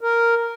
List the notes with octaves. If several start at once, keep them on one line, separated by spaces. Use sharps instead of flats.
A#4